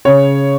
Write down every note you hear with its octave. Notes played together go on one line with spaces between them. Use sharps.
C#3 C#5